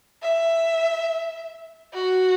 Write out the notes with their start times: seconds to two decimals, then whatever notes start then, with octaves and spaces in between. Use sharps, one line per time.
0.23 E5
1.94 F#4